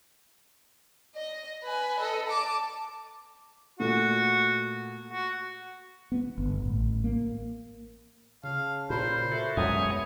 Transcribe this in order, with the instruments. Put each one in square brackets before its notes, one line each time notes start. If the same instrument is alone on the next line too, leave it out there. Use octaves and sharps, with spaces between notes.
[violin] D#5
B4 G#5
A4 D#5
A5 D6
[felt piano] A#2 A3 [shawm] F#4
[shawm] F#4
[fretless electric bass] B3
G1
A1
A#3
[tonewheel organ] C#3 [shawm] F5 [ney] A5
[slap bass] A#2 [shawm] C5 [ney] B5
[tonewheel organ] F#4 A4 [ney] E5
[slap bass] F#2 B2 G#3 [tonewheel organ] B3 C#5 G#5 [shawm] D#6